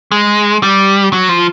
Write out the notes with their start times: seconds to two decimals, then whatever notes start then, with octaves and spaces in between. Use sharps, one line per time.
0.12 G#3
0.63 G3
1.13 F#3
1.29 F3